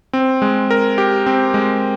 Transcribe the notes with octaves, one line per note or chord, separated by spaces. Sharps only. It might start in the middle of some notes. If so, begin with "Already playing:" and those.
C4
G#3
A#4
G4
C4
G#3